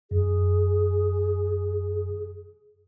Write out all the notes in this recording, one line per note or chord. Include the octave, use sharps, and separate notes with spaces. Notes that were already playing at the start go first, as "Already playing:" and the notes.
F#2 G#4